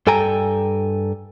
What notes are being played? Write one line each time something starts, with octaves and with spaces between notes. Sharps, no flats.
G2 A4 G5 G#5 A#5